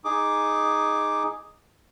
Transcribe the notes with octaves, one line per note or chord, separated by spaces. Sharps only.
D#4 G#4 D6